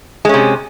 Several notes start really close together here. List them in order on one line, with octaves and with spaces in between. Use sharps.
G#3 C#4 C3